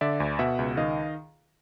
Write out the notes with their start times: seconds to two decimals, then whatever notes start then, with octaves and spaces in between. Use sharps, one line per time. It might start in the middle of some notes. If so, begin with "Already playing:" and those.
0.01 D3 D5 E5
0.20 D2
0.39 B2 E5 F#5
0.59 C#2
0.77 D#3 D#5 F5